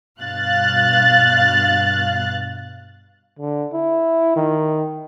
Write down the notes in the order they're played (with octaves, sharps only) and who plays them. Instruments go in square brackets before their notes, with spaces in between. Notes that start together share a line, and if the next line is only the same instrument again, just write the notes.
[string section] G2 B2 F5 F#6 A6
[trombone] D3
E4
D#3